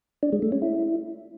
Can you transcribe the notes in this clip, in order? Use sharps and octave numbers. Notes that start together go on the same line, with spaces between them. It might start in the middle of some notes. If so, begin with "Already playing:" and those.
D4
G#3
A3
C#4
E4